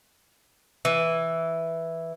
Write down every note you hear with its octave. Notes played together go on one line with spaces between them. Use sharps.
E3